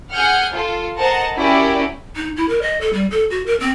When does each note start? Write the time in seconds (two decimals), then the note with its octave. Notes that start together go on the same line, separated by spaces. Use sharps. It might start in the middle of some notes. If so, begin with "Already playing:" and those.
0.13 G#4 F#5 G#5 F6 G6
0.53 F4 A4
0.98 A#4 C5 D#5 F#5 A5 A#5
1.36 C#4 E4 F#4 G4 A#4 D5
2.16 D#4
2.37 E4
2.49 A#4
2.62 D#5
2.81 A4
2.93 G3
3.11 A4
3.30 F#4
3.46 A#4
3.60 C4